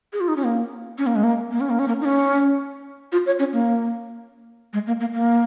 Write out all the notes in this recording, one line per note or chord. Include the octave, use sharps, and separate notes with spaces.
G#4
F4
D#4
C#4
A#3
C#4
A#3
G#3
A#3
A#3
C#4
A#3
C#4
A#3
D#4
C#4
F4
C#5
C#4
A#3
G#3
A#3
A#3
A#3